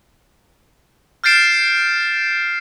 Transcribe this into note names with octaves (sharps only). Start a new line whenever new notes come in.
F6 G6 A6 C7 D7 E7